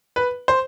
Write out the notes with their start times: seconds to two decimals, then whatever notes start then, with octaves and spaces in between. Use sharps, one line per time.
0.16 B4
0.48 C5